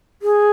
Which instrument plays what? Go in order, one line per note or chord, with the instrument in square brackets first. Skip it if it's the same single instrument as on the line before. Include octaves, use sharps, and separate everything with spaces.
[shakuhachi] G#4